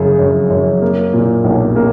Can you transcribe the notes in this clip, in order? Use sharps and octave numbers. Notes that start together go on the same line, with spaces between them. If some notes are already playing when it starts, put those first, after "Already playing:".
Already playing: F#2 C#3
F#2
F#2
A#3
A#2
B1
A#3